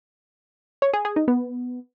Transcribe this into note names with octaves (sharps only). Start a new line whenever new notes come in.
C#5
G#4
G#4
D#4
B3